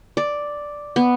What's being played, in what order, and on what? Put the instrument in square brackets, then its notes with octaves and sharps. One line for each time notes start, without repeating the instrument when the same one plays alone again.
[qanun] D5
B3